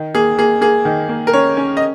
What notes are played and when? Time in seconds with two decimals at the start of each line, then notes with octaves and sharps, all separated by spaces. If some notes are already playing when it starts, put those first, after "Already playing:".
Already playing: D#3
0.15 A#3 G#4
0.38 A#3 G#4
0.61 A#3 G#4
0.85 D#3
1.09 A#3
1.27 A#4
1.33 C#4 C#5
1.57 C#4
1.77 D#5